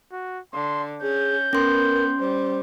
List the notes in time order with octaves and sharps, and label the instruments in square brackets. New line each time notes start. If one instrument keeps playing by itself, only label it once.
[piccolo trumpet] F#4
[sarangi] D3 [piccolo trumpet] C6
[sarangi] C#4 [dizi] G#4 [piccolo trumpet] G6
[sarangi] B3 [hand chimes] C#4 C6 [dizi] A#4
[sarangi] G3 [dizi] C5